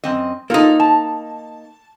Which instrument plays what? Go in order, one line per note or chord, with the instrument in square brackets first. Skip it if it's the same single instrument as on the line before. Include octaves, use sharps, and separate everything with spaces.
[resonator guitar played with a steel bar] F#2 C4 D#5
[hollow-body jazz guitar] A#3 D#4 [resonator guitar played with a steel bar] F4 A4
[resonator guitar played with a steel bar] A5